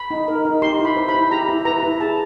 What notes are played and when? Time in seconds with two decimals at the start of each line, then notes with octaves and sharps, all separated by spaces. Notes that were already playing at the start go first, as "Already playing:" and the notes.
Already playing: B5
0.11 D#4
0.28 A#4
0.45 D#4
0.62 G4 C6
0.80 E4
0.85 B5
0.96 C5
1.09 B5
1.15 E4
1.31 G4 A#5
1.49 E4
1.65 B4 A#5
1.83 E4
2.00 G#4 A5